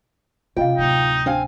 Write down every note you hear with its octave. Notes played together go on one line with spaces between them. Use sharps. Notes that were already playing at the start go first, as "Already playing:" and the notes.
C3 C#4 F4 D#5 F5 G5
D1 C3 D#4
C4 D4 F5 G#5